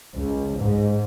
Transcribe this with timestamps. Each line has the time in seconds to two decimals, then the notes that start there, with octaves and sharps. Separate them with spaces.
0.14 C#2
0.56 G#2